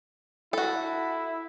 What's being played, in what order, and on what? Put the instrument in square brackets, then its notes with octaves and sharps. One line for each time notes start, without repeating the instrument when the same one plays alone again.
[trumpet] E4 [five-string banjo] F#4 A4